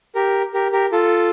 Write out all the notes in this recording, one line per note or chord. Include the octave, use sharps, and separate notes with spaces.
G4 A#4
G4 A#4
G4 A#4
F4 A4